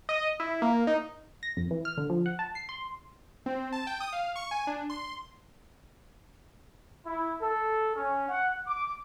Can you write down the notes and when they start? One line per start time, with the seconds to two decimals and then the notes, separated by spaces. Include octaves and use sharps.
0.09 D#5
0.40 E4
0.62 A#3
0.87 D#4
1.43 A#6
1.57 F2
1.71 E3
1.85 F6
1.98 D3
2.10 F3
2.26 F#5
2.39 A5
2.55 C7
2.69 C6
3.46 C4
3.72 A5
3.87 G5
4.00 D#6
4.13 F5
4.36 C#6
4.51 G#5
4.67 D4
4.90 C6
7.05 E4
7.42 A4
7.96 C#4
8.29 F#5
8.67 D6